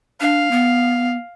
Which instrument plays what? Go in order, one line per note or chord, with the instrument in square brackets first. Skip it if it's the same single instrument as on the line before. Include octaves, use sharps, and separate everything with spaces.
[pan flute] D4 [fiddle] F5
[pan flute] B3